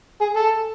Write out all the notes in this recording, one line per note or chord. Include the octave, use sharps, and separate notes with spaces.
G#4
A4